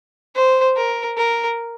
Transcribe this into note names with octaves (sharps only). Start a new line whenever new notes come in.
C5
A#4
A#4